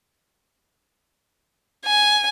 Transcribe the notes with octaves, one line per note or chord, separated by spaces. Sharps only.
G#5